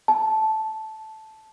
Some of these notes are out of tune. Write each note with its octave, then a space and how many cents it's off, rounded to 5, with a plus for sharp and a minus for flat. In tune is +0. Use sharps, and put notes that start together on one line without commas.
A5 -10